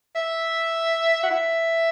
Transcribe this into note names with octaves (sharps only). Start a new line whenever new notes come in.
E5
F#5
E5